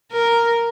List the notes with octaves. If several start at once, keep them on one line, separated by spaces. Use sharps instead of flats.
A#4